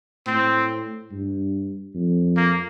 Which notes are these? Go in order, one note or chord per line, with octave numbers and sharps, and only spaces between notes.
A2 C4
G2
F2
A#3